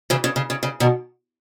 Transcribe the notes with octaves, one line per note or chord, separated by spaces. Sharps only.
C#3 E3
C#3
C#3
C#3
C#3
B2 D#3